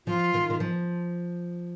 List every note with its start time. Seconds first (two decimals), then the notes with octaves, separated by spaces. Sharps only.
0.06 F3 F4
0.34 D#3
0.50 D#3
0.60 F3